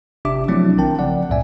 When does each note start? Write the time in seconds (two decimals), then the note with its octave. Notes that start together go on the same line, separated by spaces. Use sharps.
0.25 G1 C3 D4 G4 E5 D6
0.48 F3 F#3 A3 C4 D4 E4
0.77 A#1 D#3 C4 A#4 G5 A5
0.99 C#3 F3 D5 F#5
1.30 C#2 G2 A#2 D5 E5 G#5